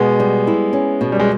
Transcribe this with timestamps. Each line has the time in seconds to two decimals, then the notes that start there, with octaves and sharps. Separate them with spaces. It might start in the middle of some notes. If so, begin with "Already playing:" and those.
Already playing: B2 G#3 B3
0.20 G3
0.47 E4
0.73 C#4
1.01 B2
1.12 G3
1.20 G#3